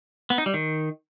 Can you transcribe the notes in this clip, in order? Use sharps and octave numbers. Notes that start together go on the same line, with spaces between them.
B3
D#4
G3
D#3